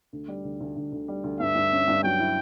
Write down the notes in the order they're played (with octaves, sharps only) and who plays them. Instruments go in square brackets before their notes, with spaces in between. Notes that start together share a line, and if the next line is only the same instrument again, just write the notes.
[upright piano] D2
G3
D2
D2
D2
D2
G3
D2
[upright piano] G2 [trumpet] E5
[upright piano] G2
C#4
G2
[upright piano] F#3 [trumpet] G5
[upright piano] E4